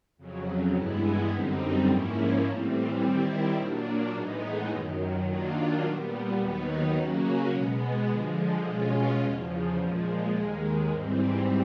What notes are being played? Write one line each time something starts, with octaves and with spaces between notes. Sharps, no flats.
F2 C#3 F#3
G2 E3 G#3 B3 E4
F#2 D3 G3 C4 D#4
G#2 F3 A#3 C#4 E4
A2 E3 G3 C4
D#3 G3 C4 E4
A#2 F#3 A#3 D4
A2 E3 G#3 B3 D#4
F#2 D#3 F#3
D#3 F#3 A#3 D4 F4
A#2 G3 B3
D#2 D#3 F#3 B3 D#4
C#3 F#3 A#3 C#4 F#4
B2 G#3 B3
D3 F3 G#3
B2 G#3 C#4 F4
E2 C#3 F3
A#2 F3 G#3
D#2 D#3 G#3
G#2 E3 G3 C4